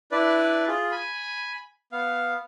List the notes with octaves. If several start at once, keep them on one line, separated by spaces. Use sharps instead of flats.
D4 E4 B4 D5
F4 G#4
G#5 B5
B3 F5